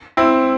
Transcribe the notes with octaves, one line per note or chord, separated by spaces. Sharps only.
C4 E4